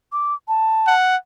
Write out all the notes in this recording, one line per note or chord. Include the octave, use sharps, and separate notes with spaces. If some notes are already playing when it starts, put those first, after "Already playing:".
D6
A5
F#5